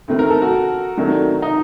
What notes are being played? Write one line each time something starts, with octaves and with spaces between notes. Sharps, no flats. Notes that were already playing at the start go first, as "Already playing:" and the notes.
D2 C3 D#3 A3 C4
A#4
A4
F#4
C3 D#3 F#3 A3 D4
D#4